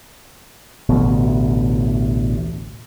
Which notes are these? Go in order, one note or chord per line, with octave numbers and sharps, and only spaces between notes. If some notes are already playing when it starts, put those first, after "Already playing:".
A1 D2 B2